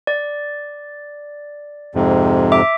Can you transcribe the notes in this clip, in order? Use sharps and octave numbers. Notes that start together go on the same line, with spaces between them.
D5
F2 G#2 C3
E5 D6